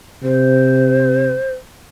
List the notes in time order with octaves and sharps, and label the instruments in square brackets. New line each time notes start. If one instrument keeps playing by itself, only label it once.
[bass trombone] C3 [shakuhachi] C5